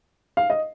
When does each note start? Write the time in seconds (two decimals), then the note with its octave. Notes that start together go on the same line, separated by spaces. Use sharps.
0.37 F5
0.50 D#5